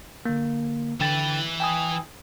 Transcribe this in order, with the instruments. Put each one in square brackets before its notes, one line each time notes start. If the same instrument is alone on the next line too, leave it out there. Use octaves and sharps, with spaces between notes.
[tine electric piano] D3 A#3
[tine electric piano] D3 G5 A6 [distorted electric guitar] E3 B4
[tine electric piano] G5 G#5 D#6